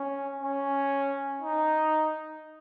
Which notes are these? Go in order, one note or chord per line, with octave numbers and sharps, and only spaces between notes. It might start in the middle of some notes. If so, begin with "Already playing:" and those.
Already playing: C#4
C#4
D#4